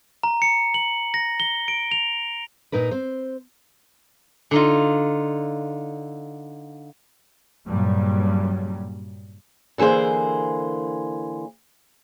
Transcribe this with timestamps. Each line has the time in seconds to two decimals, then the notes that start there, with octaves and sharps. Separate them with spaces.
0.23 A#5
0.42 C#7
0.74 F#7
1.14 A#6
1.40 G7
1.68 D7
1.91 F7
2.72 A#2 A#3 D#4 A#4 B4
2.91 C4 C5
4.51 D3 D#4 F4
7.67 G2 A#2 C#3 F#3 G3
9.78 D3 E3 A#3 G#4 C5